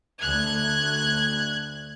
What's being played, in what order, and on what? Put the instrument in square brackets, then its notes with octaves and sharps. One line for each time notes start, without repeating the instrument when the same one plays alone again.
[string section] D2 F#6 G#6